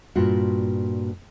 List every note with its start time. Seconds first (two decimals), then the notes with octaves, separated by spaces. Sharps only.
0.16 G2 A#2 F4 F#4